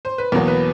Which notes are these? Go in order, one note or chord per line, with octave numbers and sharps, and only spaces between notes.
C5
B4
E2 B2 F#3 A#3 A#4
B4